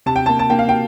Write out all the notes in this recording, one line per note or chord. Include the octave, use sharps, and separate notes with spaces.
C3 A5
G5
A#3 A5
A5
A#3 G5
F5
G5